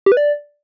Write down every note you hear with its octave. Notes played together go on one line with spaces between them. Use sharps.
G4
B4
D5